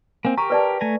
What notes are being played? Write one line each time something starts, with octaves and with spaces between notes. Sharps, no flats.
A#3 C4 G#5
G4 A#4 A#5 C#6
B4 D5 A5
A3 G#5 A#5